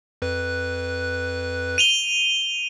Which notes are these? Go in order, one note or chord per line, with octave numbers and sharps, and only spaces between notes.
F2 B4 F#6
D#7 F7 G7